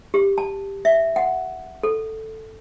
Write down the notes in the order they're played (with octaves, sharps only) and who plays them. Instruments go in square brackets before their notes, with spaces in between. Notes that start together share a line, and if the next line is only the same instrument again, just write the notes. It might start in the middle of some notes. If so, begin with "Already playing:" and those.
[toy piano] G4
A5
E5
F#5
A4